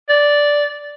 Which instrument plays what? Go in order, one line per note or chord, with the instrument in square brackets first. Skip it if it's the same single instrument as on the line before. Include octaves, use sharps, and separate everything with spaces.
[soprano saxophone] D5